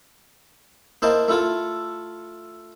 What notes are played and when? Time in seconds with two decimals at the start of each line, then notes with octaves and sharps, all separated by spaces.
1.02 A#3 E4 C5 D#5 A5
1.28 A3 E4 F4 A4